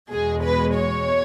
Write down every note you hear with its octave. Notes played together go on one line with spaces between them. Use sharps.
E2 B2 G#3 G#4
B4
C#5